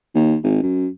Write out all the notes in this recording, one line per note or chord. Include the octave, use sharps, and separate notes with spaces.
D#2
G#1
F#2